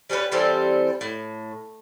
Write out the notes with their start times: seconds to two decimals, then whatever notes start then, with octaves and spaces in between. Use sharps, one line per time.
0.10 G3 C#4 D4 B4
0.32 E3 G3 C4 A4
1.01 A2